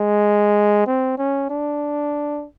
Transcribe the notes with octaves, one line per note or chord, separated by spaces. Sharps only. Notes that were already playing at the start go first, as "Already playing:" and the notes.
Already playing: G#3
C4
C#4
D4